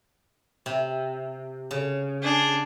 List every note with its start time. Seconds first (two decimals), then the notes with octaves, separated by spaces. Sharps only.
0.66 C3
1.71 C#3
2.23 D4 G#4